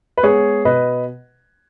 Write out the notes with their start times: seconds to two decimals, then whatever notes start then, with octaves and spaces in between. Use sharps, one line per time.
0.17 B4
0.23 G#3 B3 G#4 C#5
0.65 B2 B4 D#5